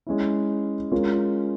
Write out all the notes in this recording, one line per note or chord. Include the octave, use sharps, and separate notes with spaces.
G#3 C#4 E4
G#3 C#4 F4 A#4